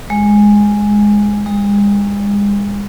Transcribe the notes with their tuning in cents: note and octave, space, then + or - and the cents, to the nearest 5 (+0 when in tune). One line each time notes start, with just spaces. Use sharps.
G#3 -5
G#3 -40